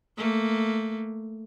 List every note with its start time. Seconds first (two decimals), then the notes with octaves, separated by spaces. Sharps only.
0.17 A3 A#3